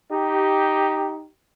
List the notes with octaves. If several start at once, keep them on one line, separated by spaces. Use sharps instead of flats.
D#4 G4